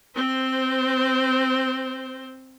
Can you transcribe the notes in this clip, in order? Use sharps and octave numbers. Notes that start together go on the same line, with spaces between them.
C4 C5